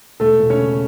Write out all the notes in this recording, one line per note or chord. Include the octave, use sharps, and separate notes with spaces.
E1 A3 A4
E1
C#4 C#5
C#3